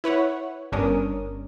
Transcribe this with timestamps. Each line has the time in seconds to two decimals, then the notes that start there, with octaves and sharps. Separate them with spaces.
0.04 E4 B4 C#5 F#5
0.72 G1 G2 C#4 D4 A#4 D#6